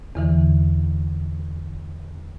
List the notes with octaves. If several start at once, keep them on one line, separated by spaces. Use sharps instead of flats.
E2 D3 E3